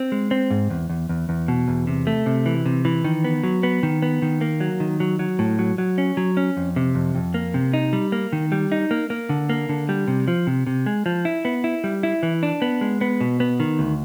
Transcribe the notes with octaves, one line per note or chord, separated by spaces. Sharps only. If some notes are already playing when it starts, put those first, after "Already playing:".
Already playing: C4
G#3
C4
G#2
E2
E2
E2
E2
B2
E2
C3
A3
C3
E3
C3
E3
D#3
B3
F#3
B3
D#3
B3
D#3
A#3
F#3
D#3
F#3
F#3
A2
F#3
F#3
C#4
F#3
C#4
F2
C3
F2
F2
A#3
C3
D#4
G3
A#3
D#3
G3
D#4
A#3
A#3
D3
A#3
D3
G3
C3
F3
C3
C3
G#3
F3
E4
B3
E4
G3
E4
E3
D4
B3
G#3
B3
B2
B3
D#3
D2